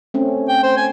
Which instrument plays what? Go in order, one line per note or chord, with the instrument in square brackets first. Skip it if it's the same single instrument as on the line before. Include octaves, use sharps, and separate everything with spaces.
[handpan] A3 C4 C#4
[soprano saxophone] G5
C5
G#5